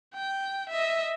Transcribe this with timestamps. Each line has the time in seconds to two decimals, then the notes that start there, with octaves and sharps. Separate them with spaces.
0.15 G5
0.70 D#5 E5